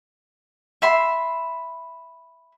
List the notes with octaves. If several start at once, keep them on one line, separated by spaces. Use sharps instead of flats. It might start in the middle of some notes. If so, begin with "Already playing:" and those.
E5 B5 C6